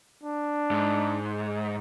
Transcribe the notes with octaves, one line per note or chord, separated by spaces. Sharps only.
D4
G#2